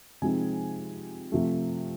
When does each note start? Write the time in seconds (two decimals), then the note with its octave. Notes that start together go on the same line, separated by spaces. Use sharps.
0.22 C3 F3 G#3 C4 D#4 G#5
1.32 C3 F3 A3